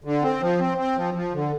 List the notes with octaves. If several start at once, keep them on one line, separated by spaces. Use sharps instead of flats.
D3
C4
F3
C4
C4
F3
F3
D3